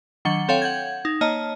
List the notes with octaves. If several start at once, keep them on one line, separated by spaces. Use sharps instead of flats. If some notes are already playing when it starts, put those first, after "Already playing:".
D#3 F#3 D4 F#5 C#7 G7
C4 A4 C#5 F5 G5
F#5 G6 G#6
D#4
A#3 C#5 D#5 A5